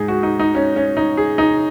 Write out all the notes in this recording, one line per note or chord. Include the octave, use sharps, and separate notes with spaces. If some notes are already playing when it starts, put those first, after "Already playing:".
Already playing: G#2 D#4 G#4
F#4
D#4
D#4
C#4
C#4
D#4
G#4
D#4